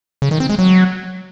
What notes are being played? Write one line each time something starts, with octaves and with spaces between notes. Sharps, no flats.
C#3
D#3
C4
G#3
F#3